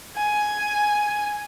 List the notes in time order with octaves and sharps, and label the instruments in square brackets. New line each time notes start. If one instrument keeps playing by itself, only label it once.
[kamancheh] G#5